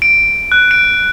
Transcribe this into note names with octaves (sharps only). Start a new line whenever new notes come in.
D7
F#6
D7